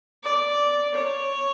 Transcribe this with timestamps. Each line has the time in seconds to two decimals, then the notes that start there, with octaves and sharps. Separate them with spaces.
0.23 D5
0.95 C#5